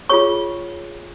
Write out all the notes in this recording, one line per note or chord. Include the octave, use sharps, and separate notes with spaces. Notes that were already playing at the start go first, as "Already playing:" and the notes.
F4 G#4 C#5 C#6